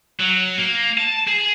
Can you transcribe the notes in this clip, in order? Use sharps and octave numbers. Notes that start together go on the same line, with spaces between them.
F#3
A#3
A5
G#4